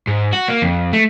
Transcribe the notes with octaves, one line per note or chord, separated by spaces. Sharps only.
G#2
F#4
A#3
F2
A3